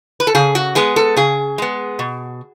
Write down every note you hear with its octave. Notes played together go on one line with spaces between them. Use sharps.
B4
A4
C#3 G#4
F#4
G#3 B3 G#4
A4
C#3 G#4
G#3 B3
B2